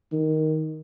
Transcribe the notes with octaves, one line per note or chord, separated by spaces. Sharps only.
D#3